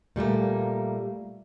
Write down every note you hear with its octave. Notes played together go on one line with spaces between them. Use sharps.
A#2 G3 A3 A#3